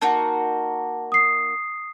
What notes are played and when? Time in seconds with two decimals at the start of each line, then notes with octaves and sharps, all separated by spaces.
0.02 A#3 D#4 F#4 A5
1.12 D#6 C7